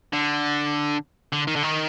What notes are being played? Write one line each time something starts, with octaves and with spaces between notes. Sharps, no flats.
D3
D3
D#3
D3
D#3